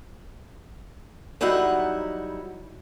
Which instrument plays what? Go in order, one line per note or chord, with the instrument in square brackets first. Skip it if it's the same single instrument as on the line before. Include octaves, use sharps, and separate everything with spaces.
[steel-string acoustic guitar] F#3 G3 D#4 E4 F#5